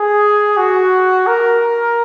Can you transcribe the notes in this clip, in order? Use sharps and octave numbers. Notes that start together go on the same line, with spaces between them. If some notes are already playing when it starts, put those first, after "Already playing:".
Already playing: G#4
F#4
A#4